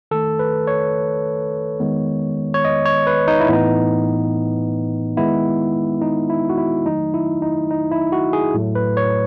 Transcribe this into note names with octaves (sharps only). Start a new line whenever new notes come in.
D#3 A3 A4
B4
C#5
D#3 G#3 B3
C#5
D#5
C#5
B4
D#4
E4
A2 E3 B3 D#4
D#3 G#3 B3 E4
D#4
E4
F#4
E4
D#3 F#3 A3 D#4
E4
D#4
D#4
E4
F#4
G#4
A2 F#3 A3
B4
C#5